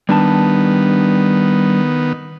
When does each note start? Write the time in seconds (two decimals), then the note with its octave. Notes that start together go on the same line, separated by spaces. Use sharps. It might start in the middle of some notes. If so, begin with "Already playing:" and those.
0.09 D#3 G3 B3 D4 A5